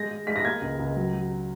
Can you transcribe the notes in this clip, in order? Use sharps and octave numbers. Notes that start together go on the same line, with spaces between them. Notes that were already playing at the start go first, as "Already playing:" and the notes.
Already playing: G#3 A#6
G#3
G#3 B6
A#6
A#3 G#6
C#2
C#2
F#3
F#3